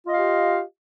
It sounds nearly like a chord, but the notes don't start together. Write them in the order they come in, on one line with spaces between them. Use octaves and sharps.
F4 D#5 F5 G4